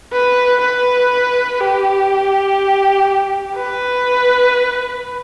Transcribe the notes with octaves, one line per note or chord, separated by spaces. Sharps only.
B4
B4
G4
B4